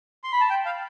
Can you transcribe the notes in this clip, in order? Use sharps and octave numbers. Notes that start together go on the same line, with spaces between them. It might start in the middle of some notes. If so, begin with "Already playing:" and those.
C6
B5
A5
G5
F5